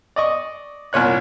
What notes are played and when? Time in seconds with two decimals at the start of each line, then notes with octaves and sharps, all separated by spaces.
0.16 D5 D#5 C#6
0.93 C2 A#2 C#5 F#6